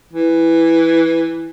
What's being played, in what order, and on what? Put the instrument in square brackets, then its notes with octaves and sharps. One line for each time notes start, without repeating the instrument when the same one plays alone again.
[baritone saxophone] E3